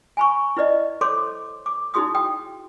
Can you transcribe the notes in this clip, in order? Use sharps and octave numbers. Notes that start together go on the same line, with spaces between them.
G#5 B5 C#6
E4 B4 D5 D#5
A4 C5 C#5 C6 D6
D6
D#4 E4 F#4 G#4 C6 D#6
G5 D#6